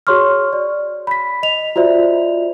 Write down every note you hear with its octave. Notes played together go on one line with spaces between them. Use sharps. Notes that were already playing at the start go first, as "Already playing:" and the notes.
F#4 G#4 C#5 C6 C#6 F6
D5
B5 B6
D#5 F7
F4 F#4 C5 D5 E5